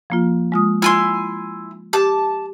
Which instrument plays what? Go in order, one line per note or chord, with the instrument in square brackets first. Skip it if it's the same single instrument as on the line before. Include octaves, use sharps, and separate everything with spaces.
[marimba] F3 A#3 F4
G#3 F4 D#6
[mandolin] E4 G#5 C6 [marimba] F4
[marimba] G4 [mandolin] A5 D6